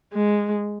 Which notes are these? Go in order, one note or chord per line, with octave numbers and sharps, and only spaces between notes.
G#3